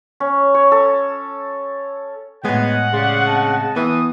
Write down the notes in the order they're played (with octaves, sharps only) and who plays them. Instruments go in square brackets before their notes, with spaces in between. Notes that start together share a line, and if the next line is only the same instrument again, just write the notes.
[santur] C#4
C#5
A4
[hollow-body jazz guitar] A2 G#3 [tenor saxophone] B3 [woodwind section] C#5 D#5 G#5 [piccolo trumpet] F#5
[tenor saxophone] C#3 [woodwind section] G4 D5 C6
[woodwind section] C4 D#5 A5
[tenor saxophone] E3 [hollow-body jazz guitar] B3 [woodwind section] D#6